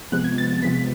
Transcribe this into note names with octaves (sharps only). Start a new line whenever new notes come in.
C3 F3 G#3 B3 F#6
G#6
A6
A6
C3 F3 G#3 B3 B6